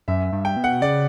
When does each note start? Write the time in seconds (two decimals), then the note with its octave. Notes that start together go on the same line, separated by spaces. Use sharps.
0.08 F#2 E5
0.33 G2
0.45 G5
0.57 B2
0.64 F#5
0.81 C#3 D5